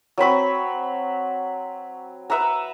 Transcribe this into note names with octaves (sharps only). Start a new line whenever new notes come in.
F#3 C4 B5 C#6
B4 E5 F#5 A#5